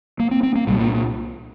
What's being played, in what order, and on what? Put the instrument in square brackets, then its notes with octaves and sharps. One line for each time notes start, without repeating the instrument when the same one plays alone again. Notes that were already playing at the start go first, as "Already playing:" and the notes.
[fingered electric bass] A#3
C4
C4
A#3
C2 A#2 G3
A#3